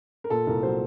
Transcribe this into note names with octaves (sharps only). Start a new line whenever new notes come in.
A#4
A#2 A4
C2 A#4
F#3 C5